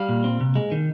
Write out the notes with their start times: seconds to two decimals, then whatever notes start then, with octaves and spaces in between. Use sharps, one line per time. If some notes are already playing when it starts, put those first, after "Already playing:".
Already playing: G3 F5
0.09 A#2
0.24 C4
0.41 C3
0.56 G#3
0.72 D#3